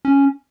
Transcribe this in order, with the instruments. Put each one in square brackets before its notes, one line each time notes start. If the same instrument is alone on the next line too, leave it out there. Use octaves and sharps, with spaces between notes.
[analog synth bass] C#4